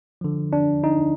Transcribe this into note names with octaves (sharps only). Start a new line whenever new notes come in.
D3 F3
D4
D#4